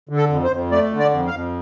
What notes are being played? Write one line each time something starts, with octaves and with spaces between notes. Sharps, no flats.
D3
A4
F2
C5
F2
A3 D5
D3
D5
F2
F5
F2